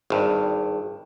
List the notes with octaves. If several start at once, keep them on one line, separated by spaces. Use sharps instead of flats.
G#1 G2